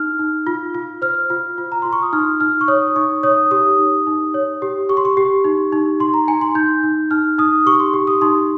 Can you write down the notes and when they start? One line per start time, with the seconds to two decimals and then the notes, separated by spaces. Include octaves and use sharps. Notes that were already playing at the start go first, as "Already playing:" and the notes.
Already playing: D#4 F6
0.19 D#4
0.47 F4
0.75 F4
1.02 C5 F6
1.30 F4
1.58 F4
1.72 A#5
1.82 F4 C6
1.93 C#6
2.02 D#6
2.13 D#4 F6
2.40 D#4 F6
2.61 C#6
2.68 C#5 D#6
2.96 D#4 C#6
3.23 C#5 D#6
3.51 G4 D#6
3.78 D#4
4.07 D#4
4.34 C#5
4.62 G4
4.89 G4 C#6
4.97 C6
5.05 C#6
5.17 G4
5.44 D#4
5.72 D#4
6.00 D#4 C6
6.14 A#5
6.28 D#4 G#5
6.41 C6
6.55 D#4 G6
6.83 D#4
7.11 D#4 F6
7.38 D#4 D#6
7.66 G4 C#6
7.80 C6
7.94 G4
8.07 D#6
8.21 D#4 C6